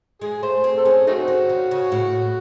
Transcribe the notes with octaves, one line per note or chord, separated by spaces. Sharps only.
G#3 G#4
A3 C5
C4
A4
C#4 G#4
A3 C4 D#4 F#4
D#3
C#3
C#3
A2